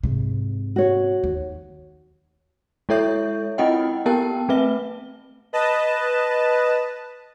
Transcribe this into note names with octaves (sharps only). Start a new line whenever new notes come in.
G#2 C3
F#4 C#5
D#2
G#3 E4 A4 C#5 E5 G6
C4 E4 F4 D#5 F#5 G5
B3 G4 A#4 G5 A5
A3 C4 B4 E5 G7
B4 D#5 A5